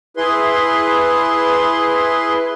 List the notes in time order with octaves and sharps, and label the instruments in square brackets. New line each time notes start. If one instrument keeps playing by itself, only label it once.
[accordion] E4 G#4 B4 C6